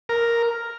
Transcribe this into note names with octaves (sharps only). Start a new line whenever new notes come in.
A#4